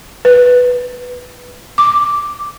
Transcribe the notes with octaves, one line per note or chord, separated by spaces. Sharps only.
B4
D6